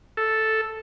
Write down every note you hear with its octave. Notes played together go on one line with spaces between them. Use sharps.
A4